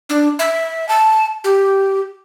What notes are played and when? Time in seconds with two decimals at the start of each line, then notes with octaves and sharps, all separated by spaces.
0.10 D4
0.39 E5
0.89 A5
1.44 G4